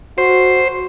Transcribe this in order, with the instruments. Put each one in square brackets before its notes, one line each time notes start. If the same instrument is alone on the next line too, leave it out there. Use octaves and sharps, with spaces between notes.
[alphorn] F#4 [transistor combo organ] C5